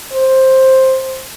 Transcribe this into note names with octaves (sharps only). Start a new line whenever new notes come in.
C5